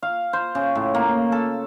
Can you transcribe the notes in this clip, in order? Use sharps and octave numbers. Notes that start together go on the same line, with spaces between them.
F5
C5
C#3
A2
A#3
A4